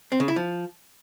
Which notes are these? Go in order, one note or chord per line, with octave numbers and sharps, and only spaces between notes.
C4
C#3
E4
F3